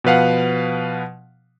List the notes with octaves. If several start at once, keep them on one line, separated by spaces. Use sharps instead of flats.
B2 F3 B4 F5 F#5